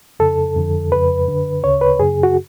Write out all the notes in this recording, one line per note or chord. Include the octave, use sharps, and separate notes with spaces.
F2 C#3 A4
F2 D3
F2 C#3 B4
F#2 D3
D2 C#3 C#5
B4
F#2 C#3 G#4
F#4